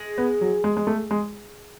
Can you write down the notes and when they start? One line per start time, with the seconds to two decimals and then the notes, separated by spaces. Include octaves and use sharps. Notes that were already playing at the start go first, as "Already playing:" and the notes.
Already playing: G#3
0.18 B3
0.41 F#3
0.64 G#3
0.77 G#3
0.87 A3
1.11 G#3